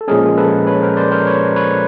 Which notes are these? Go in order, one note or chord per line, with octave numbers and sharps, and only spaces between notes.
A4
A#2 F3 G#3 C#4 G#4 A#4
A4 B4
B4 C#5
A#4 C5
C5 D5
A#4 C5
B4 C#5
B4 C#5